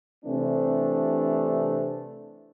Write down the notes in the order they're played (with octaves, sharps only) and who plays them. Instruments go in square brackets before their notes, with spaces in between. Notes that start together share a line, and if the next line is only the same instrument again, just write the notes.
[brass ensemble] C3 E3 A3 C4 D4